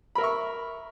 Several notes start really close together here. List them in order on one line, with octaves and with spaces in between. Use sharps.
B5 A#4 E5 C#6